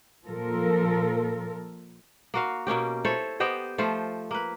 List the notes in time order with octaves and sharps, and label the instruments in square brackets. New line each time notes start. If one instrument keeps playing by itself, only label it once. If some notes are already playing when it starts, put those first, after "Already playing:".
[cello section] A#2 F3 A4 A#4
[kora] A#3 F#4 F5
B2 A#3 C#4 G4
E4 A4 C5 C#5
B3 G4 C5 D#5
F3 A3 F4 C5
A#3 B4